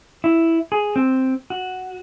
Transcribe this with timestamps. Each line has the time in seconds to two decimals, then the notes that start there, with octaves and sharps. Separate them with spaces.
0.24 E4
0.72 G#4
0.96 C4
1.50 F#4